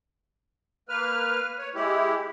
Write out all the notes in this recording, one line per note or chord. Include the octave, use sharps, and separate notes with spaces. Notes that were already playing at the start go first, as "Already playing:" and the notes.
A#3 B4 F6
C#5
G#3 E4 G4